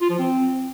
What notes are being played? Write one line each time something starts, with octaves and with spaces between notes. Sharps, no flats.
F4
F3
C4